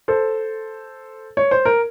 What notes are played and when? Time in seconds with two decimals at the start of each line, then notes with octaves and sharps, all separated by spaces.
0.08 A4 C5
1.37 C#5
1.51 C5
1.65 A#4